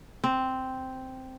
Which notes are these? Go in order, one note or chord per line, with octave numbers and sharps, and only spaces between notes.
C4